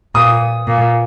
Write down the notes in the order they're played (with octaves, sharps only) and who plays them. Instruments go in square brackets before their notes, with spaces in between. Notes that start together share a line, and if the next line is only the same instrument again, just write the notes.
[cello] A#2 [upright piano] D#6
[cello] A#2